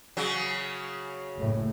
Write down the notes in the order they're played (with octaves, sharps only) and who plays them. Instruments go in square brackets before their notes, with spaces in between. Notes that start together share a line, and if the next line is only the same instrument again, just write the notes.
[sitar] C#3 F#3
[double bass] F#1 A2